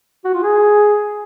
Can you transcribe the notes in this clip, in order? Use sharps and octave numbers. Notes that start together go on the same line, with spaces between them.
F#4
F4
G#4